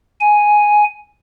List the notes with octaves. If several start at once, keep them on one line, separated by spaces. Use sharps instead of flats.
G#5